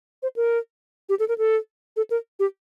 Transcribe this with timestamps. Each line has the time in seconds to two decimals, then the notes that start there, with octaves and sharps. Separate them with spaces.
0.23 C5
0.36 A#4
1.09 G4
1.20 A4
1.28 A#4
1.38 A4
1.97 A4
2.11 A#4
2.40 G4